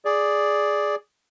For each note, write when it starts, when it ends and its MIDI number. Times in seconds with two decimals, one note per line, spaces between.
0.05 0.95 68
0.05 0.95 74